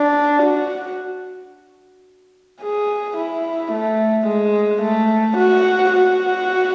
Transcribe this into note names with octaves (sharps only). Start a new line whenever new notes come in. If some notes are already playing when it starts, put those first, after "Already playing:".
Already playing: D4
F#4
G#4
E4
A3
G#3
A3
F#4
F#4